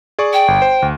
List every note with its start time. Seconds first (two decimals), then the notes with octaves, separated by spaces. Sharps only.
0.19 G#4 D5 C#6
0.33 G5
0.48 G1
0.62 C5
0.82 D2